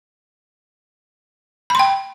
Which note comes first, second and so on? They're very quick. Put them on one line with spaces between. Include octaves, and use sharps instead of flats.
B5 C6 G5